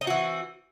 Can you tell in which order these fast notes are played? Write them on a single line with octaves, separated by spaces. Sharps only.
D#4 C4 F#4 E3